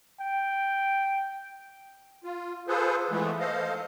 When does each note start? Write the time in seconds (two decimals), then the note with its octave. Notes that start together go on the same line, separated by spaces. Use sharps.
0.20 G5
2.24 F4
2.68 F4 G#4 A4 B4 C5
3.11 E3 G#3 A3 B3
3.40 A4 C5 D#5 F5